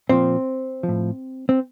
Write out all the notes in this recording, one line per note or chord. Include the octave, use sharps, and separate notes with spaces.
A#2 F3 C4
F3
A2
C4